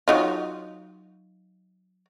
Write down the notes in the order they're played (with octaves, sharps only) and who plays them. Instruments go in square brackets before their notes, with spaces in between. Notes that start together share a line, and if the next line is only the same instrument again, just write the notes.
[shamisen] F#3 D#4 F4